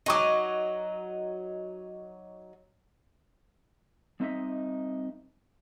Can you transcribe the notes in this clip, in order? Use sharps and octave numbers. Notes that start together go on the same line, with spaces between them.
F#3 D#4 D#5 C#6 D6
G3 C4 D#4 D#5 E5